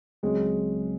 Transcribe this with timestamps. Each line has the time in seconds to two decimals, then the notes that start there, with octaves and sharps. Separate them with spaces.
0.23 C#2 C#3 F#3 G#3 C4